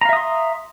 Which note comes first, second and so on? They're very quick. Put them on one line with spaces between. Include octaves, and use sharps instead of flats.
A#5 F5 E5 D#6 C6